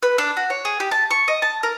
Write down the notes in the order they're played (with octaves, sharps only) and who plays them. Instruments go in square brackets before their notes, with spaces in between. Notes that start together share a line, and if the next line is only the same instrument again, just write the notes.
[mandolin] B4
D4
F#4
C#5
G#4
G4
A5
C#6
D#5
A5
A#4